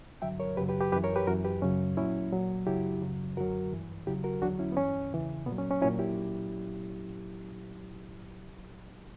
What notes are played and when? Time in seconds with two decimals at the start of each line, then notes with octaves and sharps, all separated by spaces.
0.22 G2 D3 F#3 E5 G5
0.40 A#4 C#5
0.57 F#2 C#3 F#3 G4 B4
0.69 G4 B4
0.81 G4 B4
0.92 F#2 G4 B4
0.96 E3
1.04 A#4 C#5
1.16 G4 B4
1.27 F#2 F#4 A#4
1.31 E3
1.44 G4 B4
1.62 F#2 C#3 F#3 C#4
1.97 A#2 F#3 C#4 E4
2.32 A#2 F#3
2.67 F#2 C#3 F#3 E4 G4
3.02 F#2 C#3 F#3
3.37 F#2 D3 F#3 F#4 A#4
3.72 G2 E3
4.07 E2 C#3 F#3 E4 G4
4.24 F#4 A#4
4.41 E2 D3 F#3 D4 F#4
4.59 C#4 E4
4.72 B3
4.77 G2 E3 C#4
5.11 E2 C#3 E3
5.46 A#2 B3
5.52 F#3
5.58 C#4
5.71 C#4
5.82 F#3 C#4 E4
5.85 A#2
5.99 E4 G4